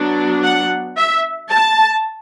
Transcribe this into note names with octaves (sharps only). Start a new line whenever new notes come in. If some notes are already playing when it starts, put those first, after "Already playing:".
Already playing: F#3 B3 D4
F#5
E5
A5